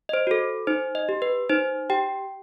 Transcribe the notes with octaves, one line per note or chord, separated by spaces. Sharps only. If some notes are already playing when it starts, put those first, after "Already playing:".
D#5
C5
F#4 A4
D#4 C5
D#5
G4
B4
D#4 C5
G4 G5